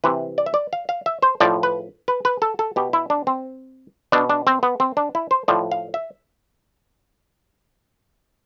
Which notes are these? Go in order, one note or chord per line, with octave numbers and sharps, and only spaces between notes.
C3 E3 B4
D5
E5
D5
F5
F5
E5
C5
A2 F3 D5
B4
B4
B4
A4
A4
B2 G4
E4
D4
C4
B2 D4
D4
C4
B3
C4
D4
E4
C5
A2 F3 D5
F5
E5